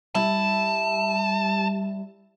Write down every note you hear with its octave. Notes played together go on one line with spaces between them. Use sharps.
G3 E4 A5